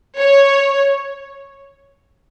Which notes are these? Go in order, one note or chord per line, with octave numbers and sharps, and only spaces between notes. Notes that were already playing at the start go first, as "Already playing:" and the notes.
C#5